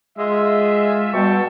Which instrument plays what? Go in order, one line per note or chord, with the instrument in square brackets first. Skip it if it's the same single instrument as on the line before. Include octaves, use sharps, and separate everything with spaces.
[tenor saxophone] G#3 [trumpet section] F4 E5
[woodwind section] B2 G3 [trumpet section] G5 A5 C#6